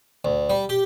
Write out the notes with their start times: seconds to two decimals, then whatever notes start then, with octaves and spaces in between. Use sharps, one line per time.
0.25 D2
0.50 G3
0.69 G4